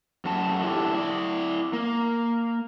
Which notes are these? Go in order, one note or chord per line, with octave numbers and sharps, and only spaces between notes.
F#2 A3 F#4 A5
D4 E4 G4 A4
E4 D5
A#3